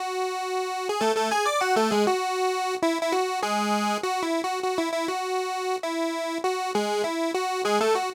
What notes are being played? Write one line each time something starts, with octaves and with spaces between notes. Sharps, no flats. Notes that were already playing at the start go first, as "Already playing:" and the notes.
Already playing: F#4
G#4
A3 A4
A3 A4
G#4 G#5
D5 D6
F#4 F#5
A3 A4
G#3 G#4
F#4
E4
E4
F#4
G#3 G#4
F#4
E4
F#4
F#4
E4
E4
F#4
E4
F#4
G#3 G#4
E4
F#4
G#3 G#4
A3 A4
F#4